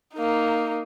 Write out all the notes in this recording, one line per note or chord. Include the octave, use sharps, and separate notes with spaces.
A#3 D#4